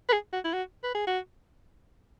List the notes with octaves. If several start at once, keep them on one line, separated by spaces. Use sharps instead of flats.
B4
G#4
F#4
E4
F#4
B4
G#4
F#4